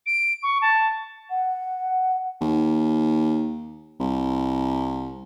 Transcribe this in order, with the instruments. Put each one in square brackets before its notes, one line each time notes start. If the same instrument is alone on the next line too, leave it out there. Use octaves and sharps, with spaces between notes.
[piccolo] D7
C#6
A5
[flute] F#5
[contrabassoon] D#2
C2